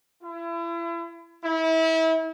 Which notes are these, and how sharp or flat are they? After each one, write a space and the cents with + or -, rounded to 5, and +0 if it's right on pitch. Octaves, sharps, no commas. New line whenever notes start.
E4 +35
E4 -30